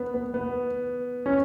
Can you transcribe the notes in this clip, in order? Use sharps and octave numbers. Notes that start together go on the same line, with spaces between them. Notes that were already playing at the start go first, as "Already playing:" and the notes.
Already playing: B3
B3
B3
C#4